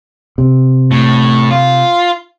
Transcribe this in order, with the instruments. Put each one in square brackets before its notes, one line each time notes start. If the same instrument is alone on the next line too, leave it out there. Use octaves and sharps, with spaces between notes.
[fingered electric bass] C3
[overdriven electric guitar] A2
F4